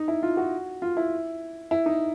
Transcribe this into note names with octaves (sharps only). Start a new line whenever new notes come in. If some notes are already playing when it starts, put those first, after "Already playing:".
Already playing: D#4
E4
F4
F#4
F4
E4
E4
D#4